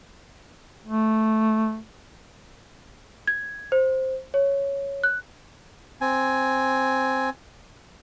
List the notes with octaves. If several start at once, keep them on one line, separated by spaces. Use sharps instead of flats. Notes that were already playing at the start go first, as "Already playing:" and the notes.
A3
G#6
C5
C#5
F#6
C4 G#5